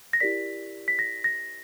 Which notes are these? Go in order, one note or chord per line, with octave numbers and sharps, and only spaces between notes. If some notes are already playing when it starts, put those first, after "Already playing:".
A#6
E4 G4 A#4 D5 B6
B6
A#6
A#6